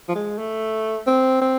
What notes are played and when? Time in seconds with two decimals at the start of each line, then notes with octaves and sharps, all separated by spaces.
0.09 F3
0.15 G#3
0.38 A3
1.07 C4
1.41 C4